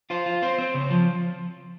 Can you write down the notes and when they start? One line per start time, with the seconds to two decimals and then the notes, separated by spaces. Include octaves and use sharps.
0.10 F4 C5
0.26 F4
0.42 C4 C5
0.59 C4
0.74 C#3
0.90 F3